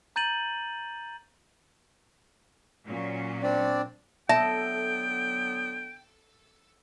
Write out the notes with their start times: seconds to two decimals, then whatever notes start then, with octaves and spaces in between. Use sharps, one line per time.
0.16 A#5 G6 A6 D#7 F#7
2.89 A#2 F#3 C#4
3.43 C4 D4 D5
4.29 D3 F#3 B3 A4 E5 G5